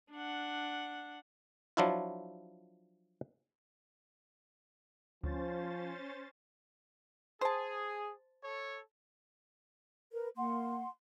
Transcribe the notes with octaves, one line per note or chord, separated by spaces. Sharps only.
D4 F#5
F3 F#3 D4 E4 F4
D2 F3 C#4 C5 A6
G#4 C5 A5
A4 C#5
A#4 B4
A#3 F#5 C6